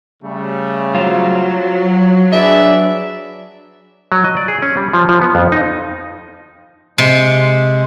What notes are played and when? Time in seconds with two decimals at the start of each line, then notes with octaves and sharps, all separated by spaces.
0.22 C#3 G3 A3
0.95 F#3 F4 C5 F5
2.32 D4 G#4 B4 D5 E5
4.12 F#3
4.25 D#5
4.37 D5
4.48 G#4
4.62 C#4
4.77 G3
4.93 F3
5.09 F3
5.21 B3
5.35 F2
5.52 D#4
6.98 C3 G#3